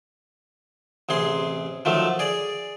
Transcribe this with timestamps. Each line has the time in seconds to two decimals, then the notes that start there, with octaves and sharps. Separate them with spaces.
1.09 A1 C3 G#4 C6
1.85 D#3 F3 F#3 A3
2.19 G#4 D5